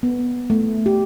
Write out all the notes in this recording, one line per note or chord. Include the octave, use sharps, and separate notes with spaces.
B3
A3
G4